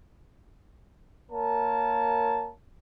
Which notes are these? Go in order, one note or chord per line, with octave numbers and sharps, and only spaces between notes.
A#3 A#4 C#5 A5